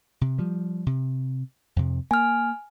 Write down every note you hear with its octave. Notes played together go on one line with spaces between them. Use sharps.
C3
F3 G3
C3
F2 C3
A#3 G#5 F6